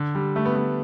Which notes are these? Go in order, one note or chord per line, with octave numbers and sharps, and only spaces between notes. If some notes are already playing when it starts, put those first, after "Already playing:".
Already playing: D3
G3
A3
B3
A3